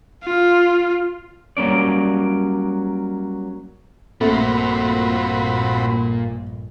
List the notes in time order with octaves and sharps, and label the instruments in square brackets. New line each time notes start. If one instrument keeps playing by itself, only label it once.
[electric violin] F4
[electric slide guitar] F#3 G3 A#3 C#4 D5
[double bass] A#1 G2 [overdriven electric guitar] A#2 A#3 [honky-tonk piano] A3 [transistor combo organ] C4 F#4 B5